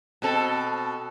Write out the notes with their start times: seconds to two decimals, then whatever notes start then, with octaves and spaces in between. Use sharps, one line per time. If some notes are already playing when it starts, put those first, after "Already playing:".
0.22 B2 C4 A4